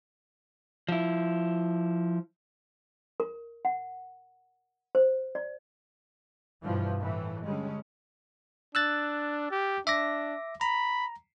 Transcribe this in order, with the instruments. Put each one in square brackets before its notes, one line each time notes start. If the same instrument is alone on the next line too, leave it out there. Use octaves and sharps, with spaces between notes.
[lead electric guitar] F3 E4
[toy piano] A#4
F#5
C5
D5
[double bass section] G2 B2 E3 F3
A2 E3 A3
D3 G3 G#3 C#4
[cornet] D4 [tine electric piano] E6 F#6 A6
[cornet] G4
[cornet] D4 [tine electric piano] E5 D6 A#6
[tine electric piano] A#5 [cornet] B5